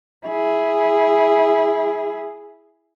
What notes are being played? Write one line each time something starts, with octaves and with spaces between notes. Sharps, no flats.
E4 G#4